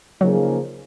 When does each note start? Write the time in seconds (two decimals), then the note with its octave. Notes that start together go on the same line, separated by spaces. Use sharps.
0.20 C#3 F3 F#3 A#3 D#4 G#4